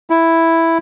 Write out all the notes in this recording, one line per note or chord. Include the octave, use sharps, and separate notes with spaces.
E4